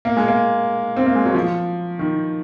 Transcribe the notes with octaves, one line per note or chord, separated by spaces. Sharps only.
A#3
G#3
A#3
C4
A#3
G#3
F#3
F3
D#3